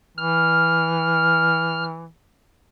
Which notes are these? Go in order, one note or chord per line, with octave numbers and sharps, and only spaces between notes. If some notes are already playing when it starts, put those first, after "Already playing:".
E3 F6